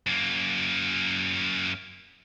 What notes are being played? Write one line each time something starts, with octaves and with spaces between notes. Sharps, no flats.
F#2 A#3